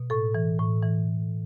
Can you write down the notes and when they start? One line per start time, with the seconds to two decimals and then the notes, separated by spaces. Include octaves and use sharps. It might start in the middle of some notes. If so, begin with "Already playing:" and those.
Already playing: B2
0.10 A2 A4
0.35 E3
0.59 A2
0.82 E3